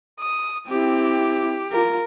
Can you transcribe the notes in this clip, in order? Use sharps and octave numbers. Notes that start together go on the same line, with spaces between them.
D#6
C4 E4 G4
F4 A#4